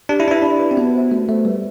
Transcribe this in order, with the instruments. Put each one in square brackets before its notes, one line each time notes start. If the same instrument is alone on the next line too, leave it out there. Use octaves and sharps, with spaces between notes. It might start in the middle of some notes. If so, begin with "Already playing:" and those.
[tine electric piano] D4 [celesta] G4
[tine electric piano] E4
[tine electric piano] D4 [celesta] D5
[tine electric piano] E4 [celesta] B4
[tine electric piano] D4 [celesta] G4
[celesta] B4 D5
[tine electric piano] C4
[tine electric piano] B3 [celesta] F#4
[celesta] C5 E5
[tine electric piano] A3 [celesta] F#4
[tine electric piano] A3 [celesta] C5 E5
[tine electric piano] G3 [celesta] B4